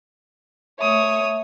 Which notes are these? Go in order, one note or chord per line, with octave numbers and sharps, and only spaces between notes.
A3 C#5 E5 D#6